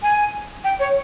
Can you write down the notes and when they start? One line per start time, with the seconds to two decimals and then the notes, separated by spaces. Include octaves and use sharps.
0.03 G#5
0.64 G5
0.79 C#5